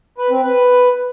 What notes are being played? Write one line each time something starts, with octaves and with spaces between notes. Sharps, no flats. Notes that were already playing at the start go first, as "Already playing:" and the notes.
B4
C4
B4